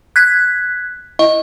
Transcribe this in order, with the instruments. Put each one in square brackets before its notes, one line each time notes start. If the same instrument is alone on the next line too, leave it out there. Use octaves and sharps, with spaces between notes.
[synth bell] F#6 G#6 B6
[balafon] E4 [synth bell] D#5